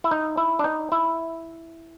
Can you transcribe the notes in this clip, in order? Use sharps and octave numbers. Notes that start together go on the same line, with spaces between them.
E4
D#4
E4
D4
D#4
E4